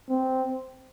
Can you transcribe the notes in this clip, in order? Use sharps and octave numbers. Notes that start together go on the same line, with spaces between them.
C4